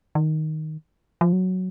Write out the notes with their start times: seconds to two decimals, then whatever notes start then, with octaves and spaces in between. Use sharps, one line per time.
0.15 D#3
1.21 F3
1.33 F#3